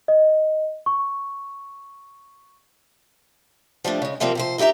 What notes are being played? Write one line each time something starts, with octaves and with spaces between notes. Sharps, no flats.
D#5
C#6
F3 G3 A3 D4
C#3 G#3
C3 F3 G3 A#3 C4 A#4
C3 F3 C5
D#4 E4 G4 E5 A#5